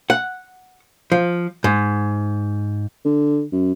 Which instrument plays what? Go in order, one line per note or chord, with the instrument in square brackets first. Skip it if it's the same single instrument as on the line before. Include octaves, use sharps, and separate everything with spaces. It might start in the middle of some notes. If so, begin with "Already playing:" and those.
[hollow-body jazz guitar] F#5
F3
G#2
[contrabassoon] D3
F#2